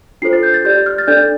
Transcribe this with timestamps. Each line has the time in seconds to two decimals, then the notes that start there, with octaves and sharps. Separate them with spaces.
0.22 D4 F4 A4 C5 C7
0.33 A6
0.43 G6
0.54 A6
0.65 G4 D5 G6
0.86 F6
0.98 A6
1.07 D4 A4 D5 G6